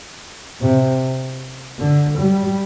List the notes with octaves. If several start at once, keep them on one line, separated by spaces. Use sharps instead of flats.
C3
D3
G3